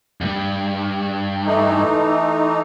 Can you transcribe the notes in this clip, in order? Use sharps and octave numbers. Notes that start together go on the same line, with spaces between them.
E2 G2
E3 A3 D#4